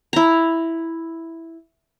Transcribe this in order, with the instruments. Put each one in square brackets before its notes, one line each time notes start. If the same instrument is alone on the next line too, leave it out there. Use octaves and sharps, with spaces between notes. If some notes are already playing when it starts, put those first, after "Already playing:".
[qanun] E4 A#5